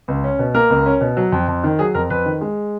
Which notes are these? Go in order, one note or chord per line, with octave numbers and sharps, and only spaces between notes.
C#2
C#4
B2
A#3 A#4
C#2
C#4
B2
F#3
F2
F2
D#3
F#3 G#4
F2 A#4
F2 B4
D#3
G#3